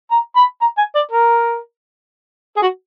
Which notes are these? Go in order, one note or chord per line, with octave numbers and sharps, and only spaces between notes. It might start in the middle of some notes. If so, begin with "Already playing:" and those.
A#5
B5
A#5
G#5
D5
A#4
G#4
F#4